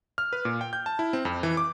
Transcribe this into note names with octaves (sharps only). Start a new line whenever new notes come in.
F6
B4
A#2
G5
G6
A5
E4
C4
F2
E3
D6